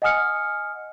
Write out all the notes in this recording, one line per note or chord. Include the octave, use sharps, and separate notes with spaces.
D#5 F#5 G#5 D#6 F6 C#7